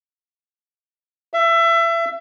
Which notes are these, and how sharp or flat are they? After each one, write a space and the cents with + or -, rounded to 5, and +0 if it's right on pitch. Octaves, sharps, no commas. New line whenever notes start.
E5 +25